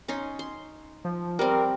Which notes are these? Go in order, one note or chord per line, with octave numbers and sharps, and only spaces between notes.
C#4 D#4 C6
C6
F3
G3 C4 A#4